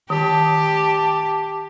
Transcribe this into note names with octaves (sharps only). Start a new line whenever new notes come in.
D#3 G4 A5